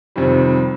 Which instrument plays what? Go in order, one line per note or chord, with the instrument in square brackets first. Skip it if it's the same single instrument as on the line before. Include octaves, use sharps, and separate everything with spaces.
[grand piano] F2 C3 D#3 G3